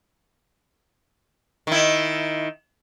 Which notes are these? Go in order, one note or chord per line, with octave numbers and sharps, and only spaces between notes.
D#3 E4